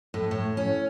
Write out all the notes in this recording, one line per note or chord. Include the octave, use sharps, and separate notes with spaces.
A2
A2
C#4